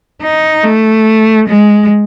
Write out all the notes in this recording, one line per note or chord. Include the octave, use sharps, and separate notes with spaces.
D#4
A3
G#3